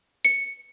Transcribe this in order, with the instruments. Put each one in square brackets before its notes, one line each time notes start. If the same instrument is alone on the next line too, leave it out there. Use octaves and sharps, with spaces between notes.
[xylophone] C#7